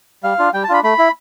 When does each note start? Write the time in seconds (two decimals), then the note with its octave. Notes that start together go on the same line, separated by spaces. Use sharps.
0.24 G3 F5
0.39 D4 F4
0.54 G3 G5
0.64 A5
0.69 D4 F4 B5
0.84 A3 B5
0.99 E4